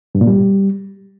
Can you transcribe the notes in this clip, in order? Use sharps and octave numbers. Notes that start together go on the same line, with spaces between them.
G2
A#2
G3